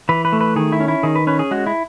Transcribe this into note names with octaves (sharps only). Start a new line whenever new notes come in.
E3 B4
B4
A3
B4
D#3 G#4
E4
C#4
E4
D#3 G#4
B4
C#4 B4
G#4
G#3 F#4
E4